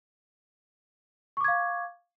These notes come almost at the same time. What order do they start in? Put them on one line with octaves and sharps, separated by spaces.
C#6 D6 G#6 F5